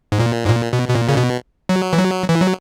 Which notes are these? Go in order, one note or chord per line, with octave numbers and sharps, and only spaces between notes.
G#2
A#2
G#2
A#2
B2
B2
A#2
C#3
B2
F#3
E3
F#3
E3
F#3